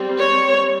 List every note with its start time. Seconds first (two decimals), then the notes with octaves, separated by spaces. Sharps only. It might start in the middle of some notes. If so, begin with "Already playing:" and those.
Already playing: G3 C4
0.18 C#5